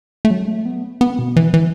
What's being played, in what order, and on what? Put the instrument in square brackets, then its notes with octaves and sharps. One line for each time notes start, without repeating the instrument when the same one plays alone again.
[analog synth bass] A3
F#3
A3
B3
B3
B2
E3
E3